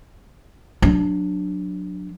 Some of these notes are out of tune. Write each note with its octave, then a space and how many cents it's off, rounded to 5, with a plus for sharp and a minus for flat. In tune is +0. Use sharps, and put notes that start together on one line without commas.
F#3 -15 D4 +0